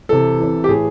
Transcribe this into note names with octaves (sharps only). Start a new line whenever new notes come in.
C3 E3 A4
E3
C3
G4
A2 E3 G#4